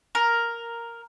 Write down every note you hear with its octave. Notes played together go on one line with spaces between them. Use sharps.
A#4